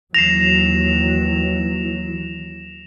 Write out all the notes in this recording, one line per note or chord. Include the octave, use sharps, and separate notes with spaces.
D#2 E3 F#3 A#6 C7 E7 F7